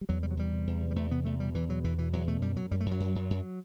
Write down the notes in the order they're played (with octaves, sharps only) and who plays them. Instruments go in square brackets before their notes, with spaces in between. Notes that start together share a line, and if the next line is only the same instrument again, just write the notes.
[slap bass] G3
E2 F#3
C3 G3
F#3
E2 G3
C3
E2
C3
G3
E2 A3
C3 B3
E2 A3
B2 G3
E2 E3
B2 F#3
E2 E3
B2 E3
E2 F#3
B2 A3
F#2 G3
F#2 F#3
F#2 G3
A3
F#2
F#3
F#2
F#2
F#2